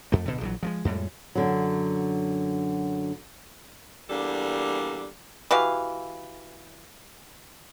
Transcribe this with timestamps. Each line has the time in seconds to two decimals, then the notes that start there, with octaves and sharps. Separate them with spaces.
0.12 F2 A3
0.25 D1 B2 D3
0.41 A#1 E3 F#3
0.63 F3 G3 G#3
0.85 F2 A2 G3 G#3
1.35 F#2 D3 F#3
4.10 E2 G3 A#3 D4 A4
5.51 E3 F#4 G4 F5